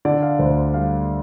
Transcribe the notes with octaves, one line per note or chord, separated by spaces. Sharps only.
D3 D5
F5
D2 C5
G3 F5